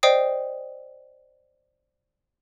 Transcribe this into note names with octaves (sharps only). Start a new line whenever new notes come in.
C5 D5 D#5 G5 D#6 C7